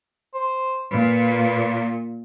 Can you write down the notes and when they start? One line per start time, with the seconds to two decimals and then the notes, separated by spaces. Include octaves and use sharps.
0.34 C5
0.92 A#2 B4